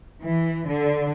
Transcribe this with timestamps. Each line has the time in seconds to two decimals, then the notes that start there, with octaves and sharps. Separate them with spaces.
0.22 E3
0.68 D3